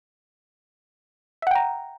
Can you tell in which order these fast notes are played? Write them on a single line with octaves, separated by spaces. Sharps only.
E5 F#5 G5 A#5